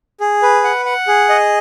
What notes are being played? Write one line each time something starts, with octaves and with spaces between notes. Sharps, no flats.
G#4
B4
F#5
F#5
G#4
D#5